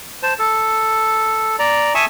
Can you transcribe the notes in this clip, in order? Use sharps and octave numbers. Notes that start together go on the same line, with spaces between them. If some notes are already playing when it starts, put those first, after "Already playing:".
C5 A5
A4
D5 A#5
E5 G#5 A5 C#6 D#6